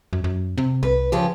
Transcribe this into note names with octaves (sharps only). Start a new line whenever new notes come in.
F#2
F#2
C3
C2 B4
C#3 F3 G4